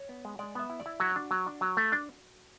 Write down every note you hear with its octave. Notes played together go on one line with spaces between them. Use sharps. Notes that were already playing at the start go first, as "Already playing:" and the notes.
Already playing: C#5
B3
G#3
G#3 D5
B3 E5
E4
D5
E4
F#3 F#4
D4
F#3
D4
F#3
A3
D4